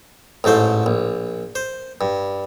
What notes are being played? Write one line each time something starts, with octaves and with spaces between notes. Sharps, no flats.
A1 G#2 A3 C5
A#1
C5
G2